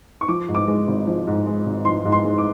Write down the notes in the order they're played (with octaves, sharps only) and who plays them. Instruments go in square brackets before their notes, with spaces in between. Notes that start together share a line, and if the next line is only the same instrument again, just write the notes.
[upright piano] C#6
F3 D6
G#2
D6
G#3
G#1
F3
G#2
G#3
G#1
F3 C6
G#2
C6
G#3
D6